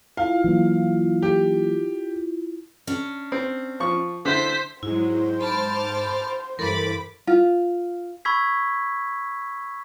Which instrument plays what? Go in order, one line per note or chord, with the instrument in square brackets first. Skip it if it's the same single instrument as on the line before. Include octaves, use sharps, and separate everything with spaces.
[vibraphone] E4 F4 [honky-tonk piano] F5
[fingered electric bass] E3 F#3 A#3
[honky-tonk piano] G4
[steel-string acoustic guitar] C#4 D4
[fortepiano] C4
F3 C#6
[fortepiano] D3 E4 [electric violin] C5 B6
[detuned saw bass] G#2 [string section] F#3 G#3 [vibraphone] E4 [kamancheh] C5
[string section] A5 D6 F6 [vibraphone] B5
[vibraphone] B5
[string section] G2 B5 D6 [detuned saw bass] E3 [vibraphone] A4 A#4
[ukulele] F4
[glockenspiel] B5 C#6 E6 G#6 B6